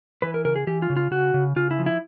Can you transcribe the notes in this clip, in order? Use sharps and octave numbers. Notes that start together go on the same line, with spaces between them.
E3 B4
A#4
C#3 A#4
G#4
E3 G4
F4
C#3
F4
C#3 F#4
C#3
C#3 F4
E4
F3
E4